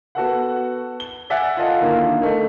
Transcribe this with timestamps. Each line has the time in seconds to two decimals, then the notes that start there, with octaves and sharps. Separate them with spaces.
0.15 B3 F#4 A4 F#5
1.00 G7
1.30 D5 E5 F#5 G#5 F#6 A6
1.57 F4 A4 D#5 F#5
1.81 D3 D#3 A#3 E4 F4
2.22 A3 D#4